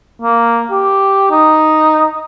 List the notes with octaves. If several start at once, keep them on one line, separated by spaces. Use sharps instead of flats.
A#3
G4
D#4